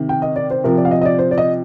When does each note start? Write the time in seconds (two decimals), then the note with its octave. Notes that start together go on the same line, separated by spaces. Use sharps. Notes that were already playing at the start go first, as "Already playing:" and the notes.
Already playing: C3 D#3
0.09 G5
0.22 D#5
0.36 D5
0.50 C5
0.64 C3 F3 A#4
0.77 D5
0.85 F5
0.91 D#5
1.01 D#5
1.05 D5
1.19 C5
1.31 D5
1.38 D#5